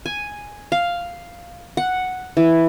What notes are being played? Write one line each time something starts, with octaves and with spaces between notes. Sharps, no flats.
G#5
F5
F#5
E3